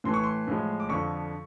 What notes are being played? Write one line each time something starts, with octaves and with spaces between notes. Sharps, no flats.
A2 E3 A3 C6
C#6
C6
A2 F3 G#3
D6
F2 D3 F3 C#6